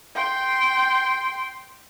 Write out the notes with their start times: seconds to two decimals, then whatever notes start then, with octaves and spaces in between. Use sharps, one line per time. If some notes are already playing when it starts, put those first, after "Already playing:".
0.15 G5 C6